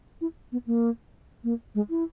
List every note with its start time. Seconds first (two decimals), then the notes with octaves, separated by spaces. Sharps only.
0.21 E4
0.52 B3
0.67 A#3
1.44 A#3
1.75 G#3
1.90 E4